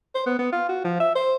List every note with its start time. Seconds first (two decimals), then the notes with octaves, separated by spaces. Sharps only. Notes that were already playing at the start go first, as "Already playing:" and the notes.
0.15 C5
0.26 B3
0.39 B3
0.52 F4
0.69 F#4
0.84 F3
1.00 E5
1.15 C5